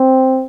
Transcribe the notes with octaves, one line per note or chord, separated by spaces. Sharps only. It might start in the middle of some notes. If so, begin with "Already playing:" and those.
Already playing: C4